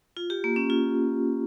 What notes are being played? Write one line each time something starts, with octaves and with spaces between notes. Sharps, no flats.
F4
G4
A#3
C#4
F4